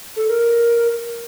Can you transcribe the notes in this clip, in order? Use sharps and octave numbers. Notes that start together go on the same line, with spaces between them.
A4
A#4